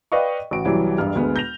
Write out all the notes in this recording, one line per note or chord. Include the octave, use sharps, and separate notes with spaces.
B4 D5 D#5 F5 G5 C#6
A1 F#4 D7
C2 E3 F#3 G3
E1 G2 F6
D2 G#3 B3
G6 A#6 F7